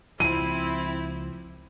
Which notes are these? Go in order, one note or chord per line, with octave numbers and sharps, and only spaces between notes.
C#2 F3 C4 E4 D#7